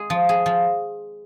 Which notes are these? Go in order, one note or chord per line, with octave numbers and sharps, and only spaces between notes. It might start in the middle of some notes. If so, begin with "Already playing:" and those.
Already playing: G#3 G#4
F3
G#4
F3